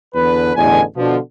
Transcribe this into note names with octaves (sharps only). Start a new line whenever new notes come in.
E2 D3 B4
A1 E2 D3 D#5 G#5
B2 D3 F3